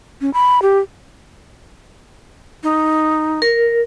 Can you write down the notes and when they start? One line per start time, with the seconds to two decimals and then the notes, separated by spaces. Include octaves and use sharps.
0.21 C#4
0.34 B5
0.62 G4
2.63 D#4
3.42 A#4